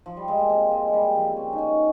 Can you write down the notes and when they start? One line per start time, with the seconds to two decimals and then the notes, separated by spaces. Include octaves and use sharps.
0.06 F3
0.17 G3
0.28 G#3
0.39 A#3
0.49 C4
0.71 G#3
0.87 G#3
0.93 G3
1.15 F3
1.28 C4
1.36 C#4
1.53 D#4
1.58 C#4